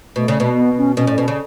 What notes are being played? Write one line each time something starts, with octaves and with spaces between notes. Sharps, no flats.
B2 A3
C#3
B2
B3
C#4
B2 C#4
A2
B2
C#3